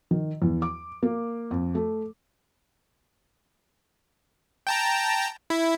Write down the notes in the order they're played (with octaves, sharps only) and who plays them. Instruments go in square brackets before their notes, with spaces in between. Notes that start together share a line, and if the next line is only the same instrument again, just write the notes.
[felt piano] D#3
E2
D6
A#3
F2
A3
[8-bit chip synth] G5 A5 A#5
E4